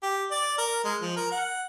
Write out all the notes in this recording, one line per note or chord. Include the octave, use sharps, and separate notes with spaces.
G4
D5
A#4
G#3
F3
A#4
F#5